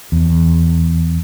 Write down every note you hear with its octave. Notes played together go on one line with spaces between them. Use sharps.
E2